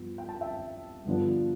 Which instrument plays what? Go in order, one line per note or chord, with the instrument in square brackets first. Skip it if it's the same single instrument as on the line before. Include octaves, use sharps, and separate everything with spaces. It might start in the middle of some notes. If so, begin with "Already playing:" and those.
Already playing: [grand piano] G2 F3 B3
G5
A5
E5 G5
G2 D3 F3 B3 D4